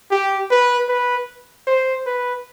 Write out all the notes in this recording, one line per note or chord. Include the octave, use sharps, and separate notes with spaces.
G4
B4
B4
C5
B4